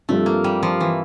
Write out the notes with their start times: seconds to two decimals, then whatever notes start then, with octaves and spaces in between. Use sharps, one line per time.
0.09 G2 F3 A3 C4
0.26 A#3
0.44 G3
0.63 F3
0.80 E3